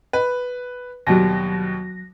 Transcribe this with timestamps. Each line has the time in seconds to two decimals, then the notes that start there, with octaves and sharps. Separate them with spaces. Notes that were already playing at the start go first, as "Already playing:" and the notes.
0.13 B4
1.07 D#2 B2 F#3 G3 A#6